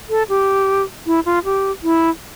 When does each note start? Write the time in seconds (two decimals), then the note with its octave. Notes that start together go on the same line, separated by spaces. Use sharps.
0.10 A4
0.29 G4
1.06 E4
1.26 F4
1.45 G4
1.83 E4